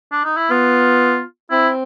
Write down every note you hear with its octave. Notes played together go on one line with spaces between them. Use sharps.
D4
D#4
E4
B3 F4
C4 E4